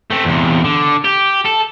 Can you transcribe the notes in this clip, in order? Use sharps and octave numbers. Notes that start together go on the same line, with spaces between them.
A3 C4
E2 C3
D3
G4
A4